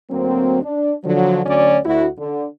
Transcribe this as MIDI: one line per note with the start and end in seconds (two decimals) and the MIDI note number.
0.11 0.63 38
0.11 0.63 54
0.11 0.63 58
0.11 0.63 60
0.63 0.93 62
1.05 1.41 50
1.05 1.41 53
1.05 1.41 54
1.45 1.78 38
1.45 1.78 50
1.45 1.78 54
1.45 1.78 61
1.45 1.78 74
1.85 2.06 38
1.85 2.06 64
1.85 2.06 66
2.18 2.45 50